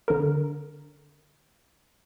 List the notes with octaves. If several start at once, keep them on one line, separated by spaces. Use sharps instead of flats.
D3 A#4